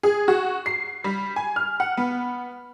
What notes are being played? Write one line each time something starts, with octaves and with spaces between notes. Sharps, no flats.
G#4
F#4
C7
G3
G#5
F6
F#5
B3